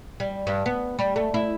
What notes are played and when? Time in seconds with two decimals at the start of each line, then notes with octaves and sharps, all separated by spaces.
0.20 G3
0.47 G2
0.66 B3
0.99 G3
1.16 A3
1.34 E4